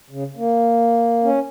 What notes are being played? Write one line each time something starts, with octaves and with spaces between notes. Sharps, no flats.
C#3
A#3
C#4